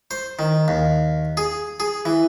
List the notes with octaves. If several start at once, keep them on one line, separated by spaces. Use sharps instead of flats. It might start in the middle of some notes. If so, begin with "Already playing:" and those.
C5
D#3
D#2
G#4
G#4
E3